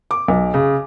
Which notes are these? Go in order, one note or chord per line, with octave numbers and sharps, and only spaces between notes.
D6
B1
C#3